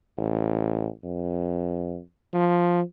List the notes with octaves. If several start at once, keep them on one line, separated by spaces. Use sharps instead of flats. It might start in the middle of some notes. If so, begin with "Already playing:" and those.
A1
F2
F3